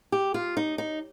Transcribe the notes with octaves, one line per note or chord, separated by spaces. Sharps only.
G4
F4
D#4
D#4